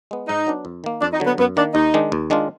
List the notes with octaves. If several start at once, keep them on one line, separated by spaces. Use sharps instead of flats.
G#3 B3
G#2 D#4
F#3 B3 D4
F2
D#3 A#3
F2 D4
D#4
D3 F#3
B3
F#2 B3
D#3 A#3 D4
D#2 D#4
D#3 G#3 D4
D#2
D#3 G#3 D4 F4